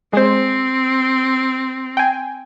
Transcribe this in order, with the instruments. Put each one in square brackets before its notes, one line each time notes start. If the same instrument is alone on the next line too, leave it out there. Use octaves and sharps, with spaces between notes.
[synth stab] G#3 C5 [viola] C4
[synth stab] G5 G#5